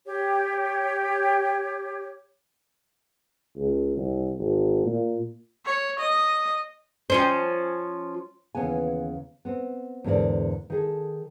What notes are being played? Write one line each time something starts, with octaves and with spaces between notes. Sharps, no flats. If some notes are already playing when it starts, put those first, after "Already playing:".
G4 C#5
C#2
C2
G#1
A#2
C#5
D#5
F3 C#4 C5
D#2 C#3 E3 B3 G#5
B3 C4
E2 G#2 D3 A#4 D5
D#3 G#4 A4